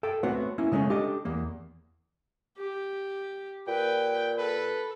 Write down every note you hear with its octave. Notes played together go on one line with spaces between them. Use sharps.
A4 G5
A3 B3 C4 F#4 C#5
A#3 C#4 E4
C#3 G#3 A3 C4 C#4
D4 G4 A4 D#5
E2 A#3
G4
A#2 B4 G5
A4 B4